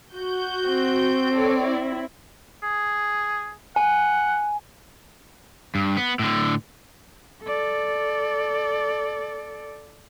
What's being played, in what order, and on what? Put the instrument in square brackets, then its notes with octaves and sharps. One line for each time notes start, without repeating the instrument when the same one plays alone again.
[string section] F#4 G6
[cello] C4
[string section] A4 C#5 D5
E4
[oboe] G#4
[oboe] F#5 [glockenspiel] G#5
[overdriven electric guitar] G2
B3
A2 D3
[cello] A4 D5